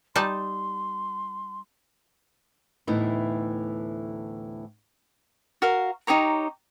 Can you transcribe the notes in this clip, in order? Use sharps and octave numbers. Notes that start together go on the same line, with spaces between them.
G3 D#4 A5 C6
D2 A2 E3 B3 D#4 E4
F#4 A#4 F5
D#4 G4 C#5 A#5